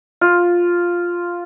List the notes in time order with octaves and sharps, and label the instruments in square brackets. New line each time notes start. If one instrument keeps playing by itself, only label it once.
[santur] F4